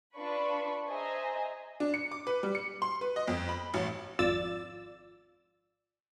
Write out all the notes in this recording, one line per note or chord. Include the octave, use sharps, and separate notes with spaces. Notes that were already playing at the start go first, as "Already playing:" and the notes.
D4 F4 B4 B5 C#6
G#4 C5 D#5 E5 G#5 A#5
D4
C#7
D6
B4
G3
C#7
C6
B4
D#5
F2
B5
A1
G#1 F2 F4 D5 E6 A6